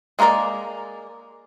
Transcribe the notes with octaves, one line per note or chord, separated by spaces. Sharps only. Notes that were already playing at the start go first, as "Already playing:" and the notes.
G#3 A#3 F4 A#4 D5